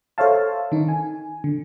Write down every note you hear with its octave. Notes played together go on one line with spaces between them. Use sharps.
A4 C5 C#5 E5 F5 A5
D#3 D#4
G#5
D3